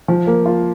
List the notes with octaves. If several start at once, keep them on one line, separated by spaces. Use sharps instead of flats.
F3
A#3
F4